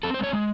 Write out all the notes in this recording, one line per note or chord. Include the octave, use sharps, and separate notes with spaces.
C4 A4
C5
G#3 C#5
G#3